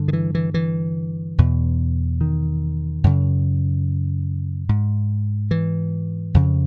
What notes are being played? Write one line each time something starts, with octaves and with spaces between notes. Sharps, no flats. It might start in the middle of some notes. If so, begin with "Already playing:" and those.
Already playing: G2 D3
D#3
E3
E3
E3
E2 B2
D#3
F#2 C#3
G#2
E3
F2 C#3